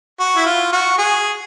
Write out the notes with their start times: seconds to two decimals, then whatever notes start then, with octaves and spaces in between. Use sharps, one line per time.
0.19 F#4
0.36 E4
0.46 F4
0.72 F#4
0.98 G#4